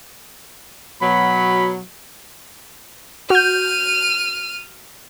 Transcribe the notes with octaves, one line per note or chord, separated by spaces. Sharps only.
B2 F#3 B5
F#4 F6 G6 D#7